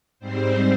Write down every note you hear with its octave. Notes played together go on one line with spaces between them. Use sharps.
G#2 G3 C4 C5